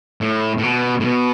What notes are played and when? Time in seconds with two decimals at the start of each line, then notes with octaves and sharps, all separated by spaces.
0.21 A2
0.58 A2
0.63 B2
1.00 A2
1.05 B2